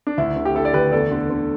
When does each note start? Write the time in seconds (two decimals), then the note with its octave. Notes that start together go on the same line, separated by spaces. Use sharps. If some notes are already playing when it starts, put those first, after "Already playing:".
0.07 D4
0.18 D2 E4
0.36 D3
0.45 G4
0.55 D3 E4 A4
0.65 D5
0.74 D2 G4 B4
0.92 E2 A4 D5
1.11 D3
1.30 D3